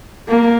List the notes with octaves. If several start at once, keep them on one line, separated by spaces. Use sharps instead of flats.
A#3